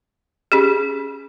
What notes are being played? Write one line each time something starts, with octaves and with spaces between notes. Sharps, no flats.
C#4 G4 G#4